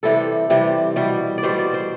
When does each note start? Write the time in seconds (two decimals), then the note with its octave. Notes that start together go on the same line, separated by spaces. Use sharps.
0.03 C3 E3 G3 A4
0.50 C3 E3 G3
0.96 B2 G3
1.38 D5
1.43 B2 G3 C5
1.59 D5
1.74 C5